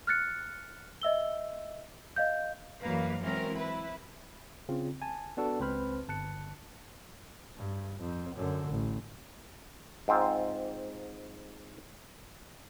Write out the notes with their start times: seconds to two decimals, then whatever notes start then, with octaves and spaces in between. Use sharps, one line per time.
0.07 F6 F#6 A6 C#7
1.02 D#5 E5 E6 G7
2.16 D#5 F5 G6
2.81 F#2 E3 G3 A#3 B4 F5
3.21 E3 F#3 G#3 C4 C#4 A#4
3.56 E4 B4
4.69 C#3 C4 F4
5.02 G#5 A5
5.37 B3 D4 F#4 A4
5.60 C#2 C4 B4 C5 B5 F6
6.08 G1 A5 F#6 C#7
7.57 G2
8.01 F2
8.36 F#2 D3
8.70 A1
10.08 G#2 C4 F4